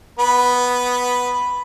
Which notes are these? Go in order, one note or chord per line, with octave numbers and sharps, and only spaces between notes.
B3 B4